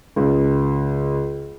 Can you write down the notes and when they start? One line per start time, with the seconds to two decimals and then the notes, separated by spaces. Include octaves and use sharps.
0.16 C#2